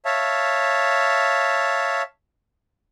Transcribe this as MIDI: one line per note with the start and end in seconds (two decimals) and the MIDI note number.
0.05 2.02 73
0.05 2.02 76
0.05 2.02 77
0.05 2.02 81